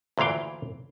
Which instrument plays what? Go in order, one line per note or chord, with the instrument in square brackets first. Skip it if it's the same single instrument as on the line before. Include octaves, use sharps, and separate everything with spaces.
[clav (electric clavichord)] D2 A#2 E3 F5 G5